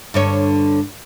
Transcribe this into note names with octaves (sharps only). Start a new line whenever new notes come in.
G2 D3 C#5